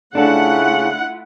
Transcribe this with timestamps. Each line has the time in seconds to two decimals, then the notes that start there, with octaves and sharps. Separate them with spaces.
0.15 C#3 A3 D4 E4 F4 A4 F#5